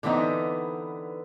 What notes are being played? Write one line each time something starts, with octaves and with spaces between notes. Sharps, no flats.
D3 E3 B3 C4 D#4